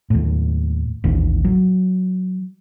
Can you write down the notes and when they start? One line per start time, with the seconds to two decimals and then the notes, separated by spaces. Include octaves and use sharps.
0.10 D#2 A2
1.04 A1 D#2
1.45 F#3